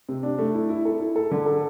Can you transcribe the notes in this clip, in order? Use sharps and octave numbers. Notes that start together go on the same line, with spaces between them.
C3
D4
A3
E4
E4
A4
E4
A4
D3
A4